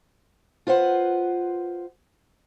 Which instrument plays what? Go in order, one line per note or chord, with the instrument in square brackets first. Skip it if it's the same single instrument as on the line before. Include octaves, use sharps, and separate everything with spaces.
[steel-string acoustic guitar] F4 B4 C5 F#5